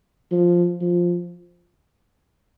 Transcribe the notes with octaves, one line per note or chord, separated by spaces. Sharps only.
F3
F3